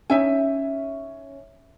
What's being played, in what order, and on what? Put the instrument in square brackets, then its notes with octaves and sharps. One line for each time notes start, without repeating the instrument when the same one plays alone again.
[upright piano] C#4 [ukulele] D#4 E5 G#5